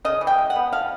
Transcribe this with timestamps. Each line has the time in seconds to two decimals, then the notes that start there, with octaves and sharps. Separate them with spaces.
0.05 C#3 D#5
0.21 E3
0.27 G5
0.38 G#3
0.50 F#5
0.56 B3
0.73 F3 F5